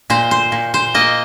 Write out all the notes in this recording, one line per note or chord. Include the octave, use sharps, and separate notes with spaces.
A#2 C5
C5
A#2
C5
A#3 D#5